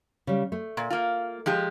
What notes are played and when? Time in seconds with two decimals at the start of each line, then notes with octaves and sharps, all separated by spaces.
0.27 C#3 G3
0.52 A3
0.77 A#2
0.90 A#3 F4
1.46 F3 G#3 G4